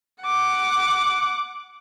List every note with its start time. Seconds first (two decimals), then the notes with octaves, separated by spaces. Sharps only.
0.22 F#5 D6